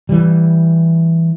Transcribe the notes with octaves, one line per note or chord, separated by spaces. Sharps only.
E3 G3